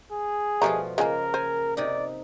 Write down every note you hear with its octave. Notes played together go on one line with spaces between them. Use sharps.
G#4
B2 F3 G3 A3 F4 A#5
C#3 G#3 A#3 F4 A#4 G#5
C5 G#5
C3 D#4 D5